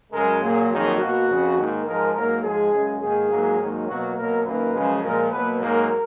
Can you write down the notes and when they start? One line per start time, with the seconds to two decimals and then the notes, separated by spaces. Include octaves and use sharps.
0.12 F#2 C#3 G#3 A#4
0.41 A#2 F#3 A#3 G#4
0.70 F2 D#3 F#3 A#3 G#4
0.98 B2 A#3 F#4
1.28 F2 C#3 F3
1.56 G#2 D#3 A#3
1.85 G#2 F3 G#3 A#4
2.14 G#2 F#3 A#3 A#4
2.42 G#2 F3 G#3 G#4
2.72 F#2 C#3 G#3
3.00 G#2 D#3 A#3 G#4
3.30 G#2 F#3 A#3
3.58 G#2 D#3 F#3 A#3
3.87 B2 F#3 A#3 F#4
4.16 B2 F#3 A#3 A#4
4.44 F#2 D#3 A#3 B4
4.73 F#2 C#3 F3 G#3
5.03 A#2 F3 G#3 A#4
5.31 B2 F#3 A#3 B4
5.60 G#2 F#3 A#3 A#4